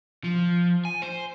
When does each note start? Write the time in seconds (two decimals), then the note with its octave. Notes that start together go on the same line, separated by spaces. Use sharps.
0.24 F3
0.85 G#5
1.02 C5